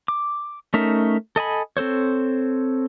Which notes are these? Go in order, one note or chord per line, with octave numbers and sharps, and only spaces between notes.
D6
A3 C#4 D#4 A#4 E5
A4 D#5 G#5 B5
C4 A4 C5 C#5